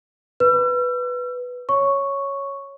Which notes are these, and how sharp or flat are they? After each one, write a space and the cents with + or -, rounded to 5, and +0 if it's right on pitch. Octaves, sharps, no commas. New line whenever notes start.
B4 +0 E6 +45
C#5 +0 C#6 +0